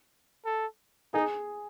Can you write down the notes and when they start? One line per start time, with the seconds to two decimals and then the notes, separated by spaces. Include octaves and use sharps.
0.46 A4
1.14 D#4 G#4